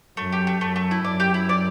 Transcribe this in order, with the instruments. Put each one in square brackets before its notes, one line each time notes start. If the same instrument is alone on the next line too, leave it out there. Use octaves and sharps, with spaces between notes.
[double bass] F#2 [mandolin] A3
[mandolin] G4
A3
[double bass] F#2 [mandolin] A3
[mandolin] A3
E4
[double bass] F#2 [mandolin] D5
[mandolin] G4
E4
D5